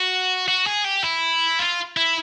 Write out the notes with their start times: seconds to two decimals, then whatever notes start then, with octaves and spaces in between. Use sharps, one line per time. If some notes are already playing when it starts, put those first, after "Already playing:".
Already playing: F#4
0.48 F#4
0.66 G#4
0.84 G4
1.04 E4
1.59 F4
1.97 E4